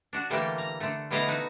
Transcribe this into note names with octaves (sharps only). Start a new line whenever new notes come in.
D4 F#4
D3 E3 G3 A3 A#3 G4
A#5
D3 A3
B2 D3 A3 E4 D#5 F5
D#4 F#4 B4